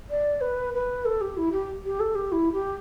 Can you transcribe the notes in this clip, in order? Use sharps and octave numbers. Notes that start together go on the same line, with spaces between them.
D5
B4
B4
A4
G4
E4
G4
G4
A4
G4
E4
G4